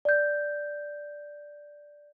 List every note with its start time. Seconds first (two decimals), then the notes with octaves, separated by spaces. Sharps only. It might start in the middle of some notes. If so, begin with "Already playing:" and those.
0.05 D5 G6